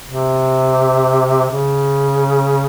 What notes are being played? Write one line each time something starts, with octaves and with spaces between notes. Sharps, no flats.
C3
C#3